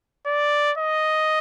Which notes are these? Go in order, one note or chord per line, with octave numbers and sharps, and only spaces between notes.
D5
D#5